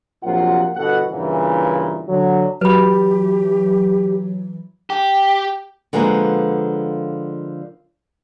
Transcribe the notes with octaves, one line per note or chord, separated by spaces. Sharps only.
A#1 C3 F#3 F4 A#4 F#5
G1 B2 A4 F#5
G2 A#2 C#3 E3
D3 F#3
E3 F#3 G4 B4 B5
G4
D3 F3 G#3 A#3 B3